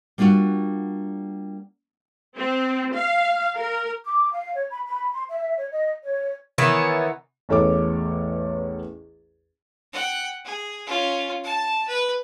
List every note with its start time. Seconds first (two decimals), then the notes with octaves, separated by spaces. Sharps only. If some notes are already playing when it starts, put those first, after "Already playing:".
0.18 G3 A#3 D4 F4 F#4
2.37 C4
2.95 F5
3.58 A#4
4.04 D6
4.32 F5
4.54 C#5
4.70 B5
4.86 B5
5.13 C6
5.29 E5
5.58 C#5
5.72 D#5
6.03 C#5
6.58 D#3 E3 B3 C#5
7.49 A1 E2 C#4 A4 C#5 D6
9.92 F#5 G5
10.45 G#4
10.87 C#4 F4
11.44 A5
11.88 B4